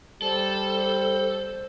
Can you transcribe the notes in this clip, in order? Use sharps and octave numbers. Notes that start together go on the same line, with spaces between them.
G3 A4 C5